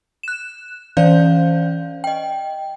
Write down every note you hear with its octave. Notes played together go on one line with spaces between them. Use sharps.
F#6 E7
E3 C#4 C5 D5 F5 G6
D#5 G5